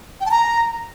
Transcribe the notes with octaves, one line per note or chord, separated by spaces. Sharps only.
G5
A5
A#5